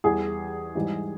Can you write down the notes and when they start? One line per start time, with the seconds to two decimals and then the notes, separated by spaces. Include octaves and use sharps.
0.04 E2 E3 G3 G#4
0.75 G#2 E3 G3